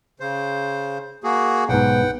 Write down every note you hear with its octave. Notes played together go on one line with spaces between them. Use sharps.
C#3 C5
A#3 F#4 G#4
B1 G#2 B3 F#5 G5